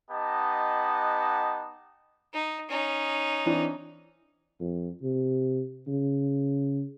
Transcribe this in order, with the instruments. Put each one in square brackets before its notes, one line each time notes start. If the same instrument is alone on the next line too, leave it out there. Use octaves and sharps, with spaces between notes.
[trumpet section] B3 D#4 G4 D#5 F#5 A5
[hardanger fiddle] D#4
C#4 D#4
[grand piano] E3 C4 D4
[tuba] F2
C3
C#3